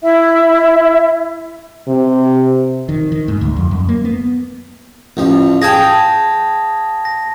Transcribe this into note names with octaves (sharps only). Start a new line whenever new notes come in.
E4 E5
C3
D#3
D#3
G#2
D2
F2
F#2
A#3
B3
A1 F3
G#4 F5 G5 A5 G#6 A#6
A#6